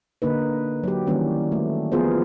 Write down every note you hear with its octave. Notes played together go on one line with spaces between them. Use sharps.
D3 A#3 D#4 B4
F#3 G4
D#3 E3 G3 A#3 C#4
A3
F3 B3 F4 G#4 A#4 C5